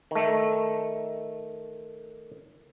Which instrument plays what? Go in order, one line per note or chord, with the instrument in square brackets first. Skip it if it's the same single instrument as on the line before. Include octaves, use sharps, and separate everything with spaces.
[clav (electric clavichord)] D#3 A3